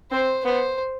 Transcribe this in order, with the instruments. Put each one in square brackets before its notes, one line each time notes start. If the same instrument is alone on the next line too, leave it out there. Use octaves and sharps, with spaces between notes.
[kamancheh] C4 [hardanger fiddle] C5
[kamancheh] B3 [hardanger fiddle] C5